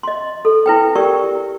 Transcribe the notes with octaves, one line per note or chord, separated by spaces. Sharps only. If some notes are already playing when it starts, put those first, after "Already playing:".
D#5 C6
A4
E4 B4 G5
G4 A#4 D5 G5 C#6